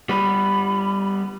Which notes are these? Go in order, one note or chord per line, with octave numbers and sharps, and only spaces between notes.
G3 B3 B5